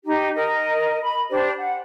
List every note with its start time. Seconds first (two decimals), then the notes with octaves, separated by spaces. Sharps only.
0.05 D#4 G4
0.35 A#4 D#5
1.02 B5
1.30 D4 G4 C5
1.58 F#5